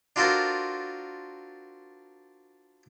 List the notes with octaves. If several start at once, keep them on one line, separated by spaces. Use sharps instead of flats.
D4 F4 F#4 A4 A#4 C5